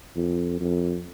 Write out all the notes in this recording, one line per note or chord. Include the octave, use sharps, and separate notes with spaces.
F2
F2